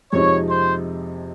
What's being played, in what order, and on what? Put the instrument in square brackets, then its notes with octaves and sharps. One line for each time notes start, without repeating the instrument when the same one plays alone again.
[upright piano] F2 C3 F3 G#3 D#4 [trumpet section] C#5
[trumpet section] C5